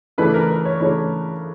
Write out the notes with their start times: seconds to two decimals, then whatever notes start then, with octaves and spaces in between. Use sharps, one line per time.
0.18 C#3 E3 A3 D4 B4
0.34 A#4
0.50 B4
0.65 C#5
0.80 C#3 E3 A3 D4 C#5